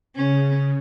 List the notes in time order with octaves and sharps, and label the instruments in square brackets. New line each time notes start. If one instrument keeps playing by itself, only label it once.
[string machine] C#3 [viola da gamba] C#4